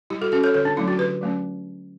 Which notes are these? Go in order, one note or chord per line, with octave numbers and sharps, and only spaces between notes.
G3 E4 G4
F#4 A4
C#4 F#4 A4
A4 C#5
D3 A4 C#5
D4
F#3 A3 C#4 E4
D4 F#4
D3 G4 B4
F#3 A3 C#4